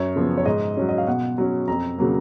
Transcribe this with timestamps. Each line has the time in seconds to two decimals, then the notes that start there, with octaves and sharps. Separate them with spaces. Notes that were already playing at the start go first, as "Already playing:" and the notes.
Already playing: F#2 C#5
0.16 C#3 F3 B3
0.37 C#5
0.45 G#2 D#5
0.77 F#3 C#4
0.89 D#5
0.98 F5
1.07 B2 F#5
1.38 F#3 C#4
1.68 F2 A#5
1.98 C#3 F#3 A#3